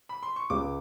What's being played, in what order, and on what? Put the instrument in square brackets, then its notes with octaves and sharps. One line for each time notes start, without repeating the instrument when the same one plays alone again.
[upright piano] B5
C6
C#6
[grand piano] C#2 [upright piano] D6